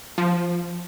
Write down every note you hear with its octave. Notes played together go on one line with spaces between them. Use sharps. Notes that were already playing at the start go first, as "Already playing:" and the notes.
F3